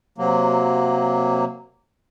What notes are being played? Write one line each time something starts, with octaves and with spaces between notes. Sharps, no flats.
C3 F#3 A#3